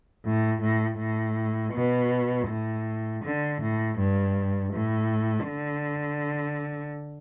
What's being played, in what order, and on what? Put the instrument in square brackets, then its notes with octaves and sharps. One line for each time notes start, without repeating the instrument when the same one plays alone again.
[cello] A2
A2
A2
B2
A2
D3
A2
G2
A2
D3